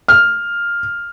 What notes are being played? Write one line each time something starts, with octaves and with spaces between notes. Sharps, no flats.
F6